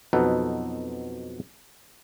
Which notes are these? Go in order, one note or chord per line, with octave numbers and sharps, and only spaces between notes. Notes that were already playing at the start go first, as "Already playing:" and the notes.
F2 B2 F#3 D#4 A4 B4